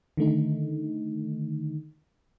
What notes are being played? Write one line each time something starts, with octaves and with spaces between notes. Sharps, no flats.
D3 D#3 A3 D#4